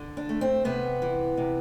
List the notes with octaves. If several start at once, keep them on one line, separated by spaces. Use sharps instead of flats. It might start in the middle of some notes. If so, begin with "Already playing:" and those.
Already playing: D3
D4
A3
C4
C3 B3
E3
C3